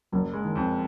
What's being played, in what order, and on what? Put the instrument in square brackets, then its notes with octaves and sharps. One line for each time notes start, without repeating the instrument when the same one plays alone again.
[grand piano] F#1 [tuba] F#3
[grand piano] G#3
[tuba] D#3
[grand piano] F2